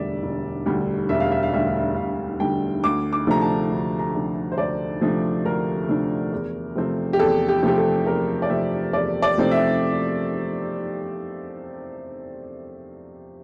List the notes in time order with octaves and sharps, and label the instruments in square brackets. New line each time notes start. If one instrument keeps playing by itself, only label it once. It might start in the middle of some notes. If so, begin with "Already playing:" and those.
Already playing: [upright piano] E1 D2 D3 G3 D5 E5
E1
D2 D3 G3
E1 E5
F5
E5
F5
D2 D3 G3 E5
F5
E5
E1 F5
D2 D3 G3 G5
D2 D6
D6
C3 F3 A3 D4 A#5
A5
D2
A#5
C3 F3 A3 D4
C5
D2 D5
C3 F3 A3 D4
D2 A#4
C3 F3 A3 D4
E2
C3 F3 A3 C4
G4
E2 A4
G4
C3 F3 A3 C4 G4
A4
E2 A#4
D5
C3 F3 A3 C4 E5
E2 D5
D5
C3 F3 A3 C4
E5